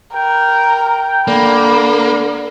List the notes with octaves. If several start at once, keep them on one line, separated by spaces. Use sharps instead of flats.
A#4 G5
D3 A#3 B5